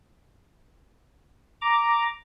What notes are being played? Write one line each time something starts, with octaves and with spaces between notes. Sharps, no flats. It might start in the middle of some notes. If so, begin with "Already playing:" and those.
A#5 D6